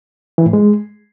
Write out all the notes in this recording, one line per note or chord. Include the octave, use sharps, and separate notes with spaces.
E3
A2
G#3